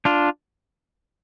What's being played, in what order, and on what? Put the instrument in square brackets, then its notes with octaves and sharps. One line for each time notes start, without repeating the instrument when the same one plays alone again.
[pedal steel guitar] D4 F4